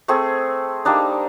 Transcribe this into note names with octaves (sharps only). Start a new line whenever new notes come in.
A3 C4 G#4
G3 A#3 D4 D#4